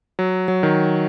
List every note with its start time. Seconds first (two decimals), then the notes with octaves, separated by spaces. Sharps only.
0.19 F#3
0.48 F#3
0.63 D#3